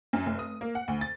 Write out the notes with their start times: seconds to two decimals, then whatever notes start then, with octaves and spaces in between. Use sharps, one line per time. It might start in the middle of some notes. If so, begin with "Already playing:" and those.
0.13 F#2
0.26 F1
0.39 D#6
0.61 A#3
0.75 F#5
0.88 D2
1.01 A6